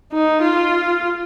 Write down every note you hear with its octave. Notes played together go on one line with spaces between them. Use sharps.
D#4
F4